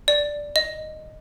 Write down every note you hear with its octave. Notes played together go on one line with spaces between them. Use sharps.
D5
D#5